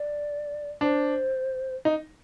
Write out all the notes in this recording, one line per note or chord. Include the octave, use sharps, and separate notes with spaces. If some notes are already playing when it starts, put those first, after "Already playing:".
Already playing: D5
D4 C5
D#4